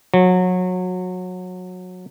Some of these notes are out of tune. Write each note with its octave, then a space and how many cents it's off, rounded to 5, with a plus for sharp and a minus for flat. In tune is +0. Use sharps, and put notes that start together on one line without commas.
F#3 -25